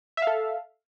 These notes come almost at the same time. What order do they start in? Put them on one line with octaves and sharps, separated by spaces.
E5 F5 A4